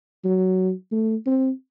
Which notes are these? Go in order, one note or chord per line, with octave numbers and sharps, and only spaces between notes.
F#3
A3
C4